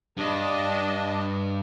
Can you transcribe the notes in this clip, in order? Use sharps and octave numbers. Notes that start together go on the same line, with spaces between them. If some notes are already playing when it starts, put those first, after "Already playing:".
G2 D4 D#5